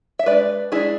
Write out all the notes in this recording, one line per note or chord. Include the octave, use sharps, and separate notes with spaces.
E5
G#3 D4 B4 D5
G#3 D4 E4 G#4